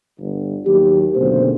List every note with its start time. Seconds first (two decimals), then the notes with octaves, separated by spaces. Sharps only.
0.18 G1
0.66 D#2 F#3 G4
1.15 F#1 D2 B2 C5